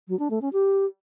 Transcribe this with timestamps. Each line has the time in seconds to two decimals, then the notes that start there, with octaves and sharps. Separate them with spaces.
0.08 F#3
0.19 D4
0.30 A3
0.41 C#4
0.53 G4